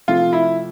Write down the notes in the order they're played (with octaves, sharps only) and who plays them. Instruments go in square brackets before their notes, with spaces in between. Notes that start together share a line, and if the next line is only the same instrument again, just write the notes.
[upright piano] C3 F3 A3 [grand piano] F4
[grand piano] E4